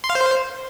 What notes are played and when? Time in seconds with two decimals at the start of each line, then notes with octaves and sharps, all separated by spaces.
0.04 C6
0.10 F5
0.15 C5